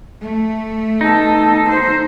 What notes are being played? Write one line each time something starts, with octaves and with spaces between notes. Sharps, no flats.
A3
B3 D#4 A4
C5